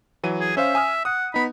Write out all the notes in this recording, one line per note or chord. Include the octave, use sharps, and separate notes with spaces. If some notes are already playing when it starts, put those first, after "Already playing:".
E3 F#3 D#7
G#4
C#4 C5 E5 F5
G#5 D#6 F6
F#5 D#6
B3 D#4 B5